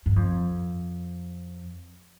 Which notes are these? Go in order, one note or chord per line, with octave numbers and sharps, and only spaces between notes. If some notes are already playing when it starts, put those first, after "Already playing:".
G2
F2